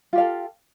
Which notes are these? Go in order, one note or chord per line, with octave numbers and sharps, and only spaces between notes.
F4 G4 A4 F5